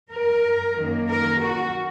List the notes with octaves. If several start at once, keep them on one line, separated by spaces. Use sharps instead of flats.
A#4
F#2 D#3 A#3
A#4
F#4